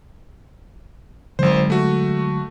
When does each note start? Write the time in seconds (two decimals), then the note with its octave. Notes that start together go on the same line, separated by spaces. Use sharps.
1.39 G#1 D3 F#3 G#3 C5
1.70 A3 F#4